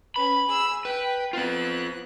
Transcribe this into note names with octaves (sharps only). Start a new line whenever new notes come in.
C#4 B4 B5
G#4 E6
B4 G5
B3 C4 F4 F#6